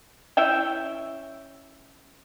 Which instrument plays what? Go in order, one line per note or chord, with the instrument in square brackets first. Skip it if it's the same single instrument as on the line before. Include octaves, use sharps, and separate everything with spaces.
[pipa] C#4 E4 E5 G5